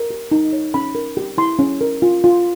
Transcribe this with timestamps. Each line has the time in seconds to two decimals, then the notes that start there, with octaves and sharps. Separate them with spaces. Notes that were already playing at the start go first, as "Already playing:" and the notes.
Already playing: A#4
0.10 G4
0.32 D#4
0.53 C#5
0.74 C#4 B5
0.95 A#4
1.17 G4
1.38 E4 C6
1.59 C#4
1.81 A#4
2.02 F4
2.24 F4